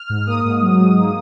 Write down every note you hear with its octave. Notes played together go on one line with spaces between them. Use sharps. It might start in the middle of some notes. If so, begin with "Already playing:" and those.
Already playing: F6
G#2
A#3 D#6
G#2
F#3
G#2
A#3